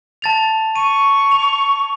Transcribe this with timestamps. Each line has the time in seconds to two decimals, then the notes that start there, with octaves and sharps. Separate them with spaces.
0.22 A5 A6 F7
0.76 C#6 D#7
1.32 F7